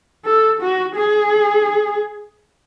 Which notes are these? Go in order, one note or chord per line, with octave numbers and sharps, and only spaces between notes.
A4
F#4
G#4